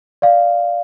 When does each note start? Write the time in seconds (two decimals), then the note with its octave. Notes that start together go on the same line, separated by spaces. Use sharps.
0.22 D5 F5